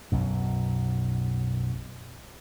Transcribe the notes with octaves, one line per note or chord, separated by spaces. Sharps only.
B1 F#2